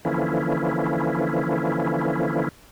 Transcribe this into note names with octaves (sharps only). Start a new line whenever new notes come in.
D3 E3 F3 A#3 C#4 E4